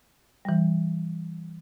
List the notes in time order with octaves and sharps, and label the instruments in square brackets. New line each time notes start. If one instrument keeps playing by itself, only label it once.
[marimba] E3 G3